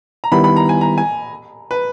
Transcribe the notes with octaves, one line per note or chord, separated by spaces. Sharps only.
A#5
D#3 G3 B3 E4 G4 B5
B5
A#5
G#5
A#5
G#5
B4